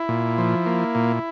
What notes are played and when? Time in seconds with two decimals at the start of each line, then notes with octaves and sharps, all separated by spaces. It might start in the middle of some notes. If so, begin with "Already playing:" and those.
Already playing: E4
0.09 A#2
0.38 F3
0.66 A#3
0.95 A#2